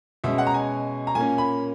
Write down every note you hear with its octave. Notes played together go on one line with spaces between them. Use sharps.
B2 G#3 C#4 E5
F#5
A#5
G#5
A#5
A#2 A#3 C#4 G#5
B5